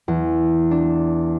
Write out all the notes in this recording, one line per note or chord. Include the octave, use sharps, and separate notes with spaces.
E2
D4